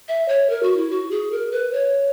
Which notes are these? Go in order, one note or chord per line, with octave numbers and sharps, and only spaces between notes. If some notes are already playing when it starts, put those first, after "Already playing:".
E5
C#5
A#4
F#4
E4
F#4
G#4
A#4
B4
C#5